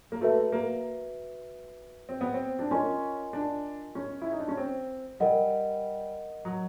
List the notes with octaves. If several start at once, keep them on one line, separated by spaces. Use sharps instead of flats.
A#3
A3 F#4 B4 E5
A#3
C4
B3
C4
D4
C#4 F4 A#4 D#5 G#5 C6
D4
C#4
E4
D#4
D4
C#4
C4
G3 A#4 D#5 F#5
F#3